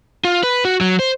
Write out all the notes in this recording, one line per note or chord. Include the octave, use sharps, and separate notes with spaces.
F4
B4
F#4
F#3
C5